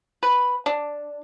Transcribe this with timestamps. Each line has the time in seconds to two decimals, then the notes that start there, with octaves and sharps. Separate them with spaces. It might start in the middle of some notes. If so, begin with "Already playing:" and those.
0.23 B4
0.66 D4